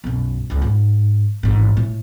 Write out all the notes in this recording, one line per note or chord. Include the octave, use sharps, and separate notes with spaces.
B1 F#2
C#2 E3
G#2
A1 G#2
A2 A3